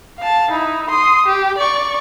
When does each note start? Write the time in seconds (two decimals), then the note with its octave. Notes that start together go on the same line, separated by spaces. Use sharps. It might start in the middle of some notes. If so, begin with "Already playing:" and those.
0.18 F5 A5
0.51 D#4 E4
0.90 C6 D#6
1.26 G4
1.58 D5 C#6